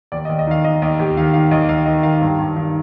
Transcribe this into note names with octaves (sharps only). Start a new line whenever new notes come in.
D#2 D5
D#2 D#5
D#5
D#3 F5
D#3 D#5
D#2 D#5
D#2 G4
D#3 F5
D#3 F5
D#2 D#5
D#2 F5
D#3 D#5
D#3 F5
G2
G2
D#3